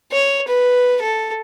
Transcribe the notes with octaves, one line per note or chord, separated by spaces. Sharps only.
C#5
B4
A4